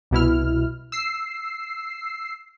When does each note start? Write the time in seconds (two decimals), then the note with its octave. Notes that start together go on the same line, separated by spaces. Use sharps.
0.11 C2 B2 E4 F6
0.92 E6 C7